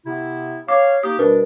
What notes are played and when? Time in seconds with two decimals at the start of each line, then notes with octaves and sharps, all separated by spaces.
0.06 C3 B3 E4
0.68 C#5 F5 D6
1.03 A#3 D#4 G4 D#6
1.19 B2 G3 D4 A#4 B4